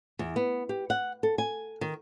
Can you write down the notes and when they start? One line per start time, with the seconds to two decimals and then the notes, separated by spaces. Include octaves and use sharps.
0.19 E2
0.36 B3
0.69 G4
0.90 F#5
1.23 A4
1.38 G#5
1.81 D#3